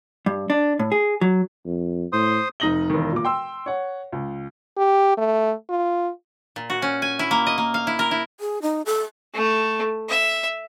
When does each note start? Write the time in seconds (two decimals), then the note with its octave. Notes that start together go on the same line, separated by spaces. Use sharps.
0.26 G2
0.50 D4
0.79 A2
0.92 G#4
1.21 F#3
1.65 F2
2.13 A2 C5 C6 D#6
2.60 F1 D#4 D#6 A#6 F#7 G7
2.90 E1 D#3
3.12 A#2 D6
3.25 G5 C6 E6
3.66 C#5 F#5
4.13 C#2
4.77 G4
5.18 A3
5.69 F4
6.56 A#2
6.70 F#4
6.82 C#4
7.02 G#5
7.19 E4
7.31 A#3
7.47 D#5
7.58 A#3
7.74 F5
7.87 E4
7.99 A#4
8.11 E4
8.40 G#4
8.62 D#4
8.86 A4
9.34 A3
10.09 E5